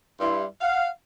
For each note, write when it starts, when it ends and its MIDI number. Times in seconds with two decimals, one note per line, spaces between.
0.20 0.45 43
0.20 0.45 64
0.20 0.45 84
0.61 0.88 77
0.61 0.88 78